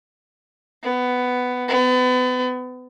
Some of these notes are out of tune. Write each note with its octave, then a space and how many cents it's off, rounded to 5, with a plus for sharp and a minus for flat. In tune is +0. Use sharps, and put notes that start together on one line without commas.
B3 +10
B3 +35